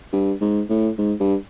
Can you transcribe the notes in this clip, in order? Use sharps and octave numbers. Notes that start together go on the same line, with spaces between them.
G2
G#2
A2
G#2
G2